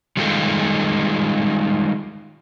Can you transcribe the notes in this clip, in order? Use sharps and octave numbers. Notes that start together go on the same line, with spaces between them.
D#3 G3 G#3 F4 G4 A4